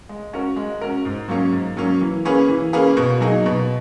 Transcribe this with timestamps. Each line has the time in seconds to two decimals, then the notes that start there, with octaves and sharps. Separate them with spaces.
0.09 G#3
0.33 C#4 F#4 A#4
0.56 G#3
0.81 C#4 F#4 A#4
1.05 G#2
1.28 F#3 A#3 C#4
1.52 G#2
1.77 F#3 A#3 C#4
2.01 E3
2.25 A#3 C#4 G#4 B4
2.48 E3
2.73 A#3 C#4 G#4 B4
2.97 B2
3.21 F#3 A#3 D#4 G#4
3.46 B2